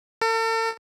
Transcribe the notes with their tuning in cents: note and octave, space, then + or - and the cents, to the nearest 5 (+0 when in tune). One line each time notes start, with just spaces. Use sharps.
A4 +45